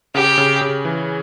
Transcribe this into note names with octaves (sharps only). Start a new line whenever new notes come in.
C#3 G4
C#3
C#3
E3